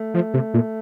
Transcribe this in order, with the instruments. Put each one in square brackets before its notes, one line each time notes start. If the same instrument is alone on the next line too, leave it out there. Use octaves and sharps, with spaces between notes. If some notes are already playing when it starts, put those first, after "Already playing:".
Already playing: [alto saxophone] A3
[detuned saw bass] F3
C3
A#2